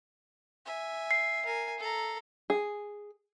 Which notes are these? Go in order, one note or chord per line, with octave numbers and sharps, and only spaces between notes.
E5 G#5
C7
A#4 G#5
A4 A#5
G#4